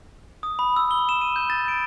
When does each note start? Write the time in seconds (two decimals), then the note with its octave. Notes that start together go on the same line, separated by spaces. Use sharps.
0.43 D#6
0.59 B5
0.76 E6
0.91 G7
1.09 E7
1.21 D#7
1.36 G6
1.50 A6
1.68 D7